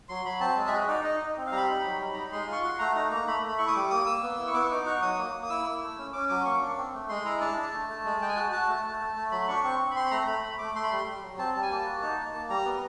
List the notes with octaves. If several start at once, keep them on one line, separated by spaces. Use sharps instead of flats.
F#3 C6
F#3 B5
C4 A5
G#3
E5
F#4 D#5
D#4 D5
D#4 D#5
D#4
C4
F5
G3 A#5
B5
D#4
F#3
G3
D#4 A#5
B5
G#3 C6
F4
C#6
F#4 C6
A3 A#5
D#4 A#5
A#3 A#5
A3 B5
A3
B5
E4 C#6
D#6
G3 D6
A#3 D#6
A#3 E6
B3
E4
C#6
B3 D6
C#6
D#4 D6
F#4 C#6
F#3 D#6
A#3
A#3
D#6
E4 E6
E4
A3
C#4
C#4 D6
F#3 D6
A#3 C#6
D4
C4
A3
G#3 C6
E4 A#5
D4 A5
D4
A3
A3
G#3
G#3 G5
G#5
F#4 A5
F#4 A5
A3
A3
A3
A3
F#3 B5
D4 C#6
C4 C#6
C4
B5
C4 C6
B5
A3 A#5
A#5
A3 B5
A3
A3 D6
A3 C6
B5
G3 C6
G3
F#3
C4 A5
G3 A5
G#5
A#3 A5
F#4
D#4
A#3
A#3
G3 A#5
B3